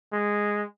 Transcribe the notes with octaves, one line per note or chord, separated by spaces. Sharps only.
G#3